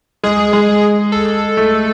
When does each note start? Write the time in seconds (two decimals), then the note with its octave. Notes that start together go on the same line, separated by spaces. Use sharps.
0.23 G#3 G#4
0.53 G#3
1.12 A4
1.57 A3